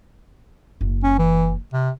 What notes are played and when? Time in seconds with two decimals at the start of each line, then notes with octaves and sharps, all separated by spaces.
0.81 F#1
1.03 C#4
1.18 E3
1.73 C3